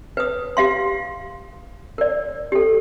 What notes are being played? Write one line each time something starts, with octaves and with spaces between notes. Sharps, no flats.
B4 D#6
G4 F5 C6
A#4 D5
G4 A4